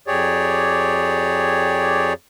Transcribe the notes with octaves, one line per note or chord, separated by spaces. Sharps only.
F2 G4 G#4 C#5 D5